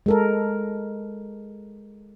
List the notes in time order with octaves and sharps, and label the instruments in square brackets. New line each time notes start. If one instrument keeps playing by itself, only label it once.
[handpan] G#3 A4 A#4